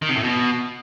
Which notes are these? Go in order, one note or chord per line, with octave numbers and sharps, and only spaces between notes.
D#3
C3
A2
B2